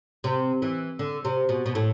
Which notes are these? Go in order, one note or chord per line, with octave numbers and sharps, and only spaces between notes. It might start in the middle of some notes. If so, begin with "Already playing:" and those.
C3
E3
D3
C3
B2
B2
A2